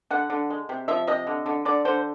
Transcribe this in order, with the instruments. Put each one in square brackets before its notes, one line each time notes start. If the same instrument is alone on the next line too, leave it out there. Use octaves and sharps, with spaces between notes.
[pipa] D3 F#5
D3
G#3
C3
F3 E5
C3 D#5
D3
D3
D3 D5
D3 C5